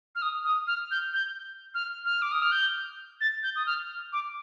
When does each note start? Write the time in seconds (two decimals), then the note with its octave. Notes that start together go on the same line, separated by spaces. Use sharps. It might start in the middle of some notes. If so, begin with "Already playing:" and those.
0.15 F6
0.22 D#6
0.45 D#6
0.67 F6
0.91 G6
1.14 G6
1.74 F6
2.05 F6
2.22 D6
2.32 D#6
2.42 F6
2.52 G6
3.21 A6
3.43 G6
3.56 D#6
3.66 F6
4.13 D6